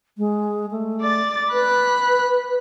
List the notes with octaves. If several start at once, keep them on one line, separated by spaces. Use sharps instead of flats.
G#3
A3
D5 A6
B4 B5 F#6